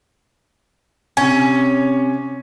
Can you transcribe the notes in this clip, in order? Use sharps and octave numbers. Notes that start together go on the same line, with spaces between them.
C3 C#4 G#5